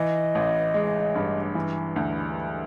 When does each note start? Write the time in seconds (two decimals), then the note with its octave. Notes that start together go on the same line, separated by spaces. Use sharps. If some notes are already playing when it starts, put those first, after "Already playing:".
Already playing: E3 D#5
0.35 A1
0.74 G#3
1.15 G2
1.55 E3
1.96 D2